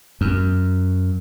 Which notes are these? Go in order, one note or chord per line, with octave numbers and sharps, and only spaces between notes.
F#2